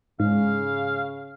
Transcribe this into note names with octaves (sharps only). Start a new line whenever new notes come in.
G#2 C#3 F5